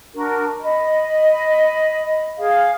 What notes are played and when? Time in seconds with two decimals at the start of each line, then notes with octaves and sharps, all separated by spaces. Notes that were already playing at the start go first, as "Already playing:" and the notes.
0.15 D4 F#4 A#4
0.60 D#5 B5
2.38 G#4 F5